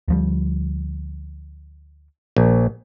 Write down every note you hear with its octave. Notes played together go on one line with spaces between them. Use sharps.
D2 F3 G3
A#1